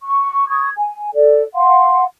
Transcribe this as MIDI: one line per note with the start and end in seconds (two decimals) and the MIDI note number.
0.02 0.48 85
0.48 0.70 85
0.48 0.70 87
0.48 0.70 92
0.77 1.10 80
1.15 1.43 69
1.15 1.43 74
1.55 2.04 77
1.55 2.04 78
1.55 2.04 84